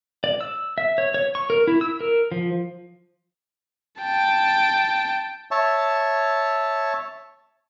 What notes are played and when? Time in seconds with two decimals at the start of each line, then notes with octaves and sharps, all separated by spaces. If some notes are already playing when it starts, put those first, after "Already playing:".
0.24 D5
0.41 E6
0.78 E5
0.98 C#5
1.14 C#5
1.35 C#6
1.50 A#4
1.67 E4
1.81 E6
2.00 A#4
2.32 F3
4.02 G5 A5
5.51 C#5 E5 A5